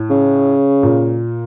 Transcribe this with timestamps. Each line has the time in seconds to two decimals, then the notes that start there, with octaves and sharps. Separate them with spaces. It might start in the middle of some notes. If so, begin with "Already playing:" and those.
Already playing: A2
0.10 C#3
0.83 A#2